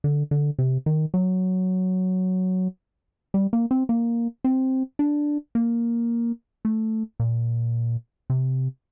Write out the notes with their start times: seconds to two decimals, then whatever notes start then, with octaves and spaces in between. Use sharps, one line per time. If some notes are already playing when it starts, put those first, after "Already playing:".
0.04 D3
0.31 D3
0.59 C3
0.86 D#3
1.14 F#3
3.34 G3
3.53 A#3
3.71 C4
3.89 A#3
4.44 C4
4.99 D4
5.55 A#3
6.65 A3
7.20 A#2
8.30 C3